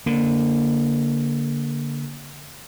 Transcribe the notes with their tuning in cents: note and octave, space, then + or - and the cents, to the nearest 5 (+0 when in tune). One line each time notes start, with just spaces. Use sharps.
D3 -25 A#3 +0